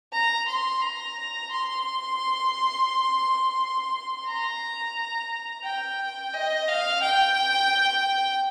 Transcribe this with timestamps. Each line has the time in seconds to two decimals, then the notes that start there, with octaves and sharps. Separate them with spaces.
0.13 A#5
0.48 C6
0.82 A#5
1.51 C6
4.27 A#5
5.64 G5
6.34 D#5
6.68 F5
7.02 G5